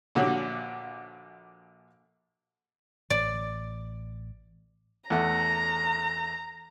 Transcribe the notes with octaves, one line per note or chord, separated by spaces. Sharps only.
A#1 A#2 D3 F#4 G4 C#5
A1 D5
E2 A3 F#5 A#5